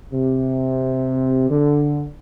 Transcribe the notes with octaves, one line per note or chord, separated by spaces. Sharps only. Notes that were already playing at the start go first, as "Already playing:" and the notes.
C3
D3